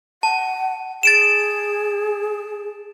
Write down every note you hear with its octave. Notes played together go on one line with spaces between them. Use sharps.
F#5 A5
G#4 A6 D7 E7